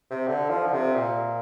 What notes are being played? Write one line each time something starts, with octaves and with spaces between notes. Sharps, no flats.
C3
D3
F3
D3
C3
A#2